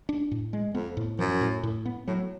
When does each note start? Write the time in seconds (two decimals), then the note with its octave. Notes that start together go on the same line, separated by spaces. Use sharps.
0.09 D4
0.31 A2
0.53 G#3
0.75 F2 B3
0.97 A2
1.19 F#2 F3
1.41 A2
1.63 A2
1.86 B3
2.08 A2 F#3